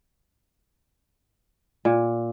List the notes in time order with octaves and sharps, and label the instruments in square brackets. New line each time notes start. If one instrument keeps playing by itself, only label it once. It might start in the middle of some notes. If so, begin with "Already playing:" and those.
[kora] A#2